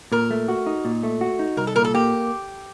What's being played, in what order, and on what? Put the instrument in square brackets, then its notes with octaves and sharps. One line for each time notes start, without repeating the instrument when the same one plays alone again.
[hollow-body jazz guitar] A#2 [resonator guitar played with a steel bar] A#4
[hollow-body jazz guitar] A3
F#4
D#4
A#2
A3
F#4
D#4
[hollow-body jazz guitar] C2 [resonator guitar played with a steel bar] A#4
[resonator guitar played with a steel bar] A4
[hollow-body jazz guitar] A#2 [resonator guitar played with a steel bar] A#4
[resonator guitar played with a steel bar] A4
[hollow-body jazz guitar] A#3 [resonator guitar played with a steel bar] G4